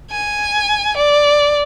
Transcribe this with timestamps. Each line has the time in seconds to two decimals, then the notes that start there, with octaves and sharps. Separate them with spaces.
0.11 G#5
0.97 D5